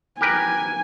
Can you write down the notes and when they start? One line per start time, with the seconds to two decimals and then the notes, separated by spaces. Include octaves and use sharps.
0.21 G4 A#4 B4 G#5